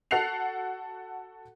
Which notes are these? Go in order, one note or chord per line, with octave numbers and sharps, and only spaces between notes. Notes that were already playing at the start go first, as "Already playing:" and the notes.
F#4 A4 F#5 F#6 C7 F7